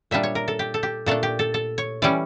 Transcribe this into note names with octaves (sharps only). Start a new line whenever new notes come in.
A#2 G3 D4 E5
C#5
A#4
A4
G4
A4
G4
A#2 A3 D4 A4
G4
A4
A4
C#5
E3 G3 C#4 D5